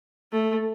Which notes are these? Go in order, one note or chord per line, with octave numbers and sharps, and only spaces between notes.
A3